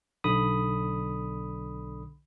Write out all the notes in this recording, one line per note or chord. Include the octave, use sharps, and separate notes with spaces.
B1 D3 B5 D#6